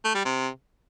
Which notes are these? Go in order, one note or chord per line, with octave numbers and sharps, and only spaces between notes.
A3
G3
C3